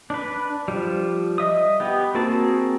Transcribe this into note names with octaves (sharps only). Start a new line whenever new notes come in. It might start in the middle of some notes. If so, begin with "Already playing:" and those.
D4 B4
F3 G3
D#5 E5 D#6
B3 G4
A#3 C4 F#4 G#4 A5